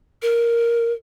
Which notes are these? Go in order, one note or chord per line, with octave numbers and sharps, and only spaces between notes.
A#4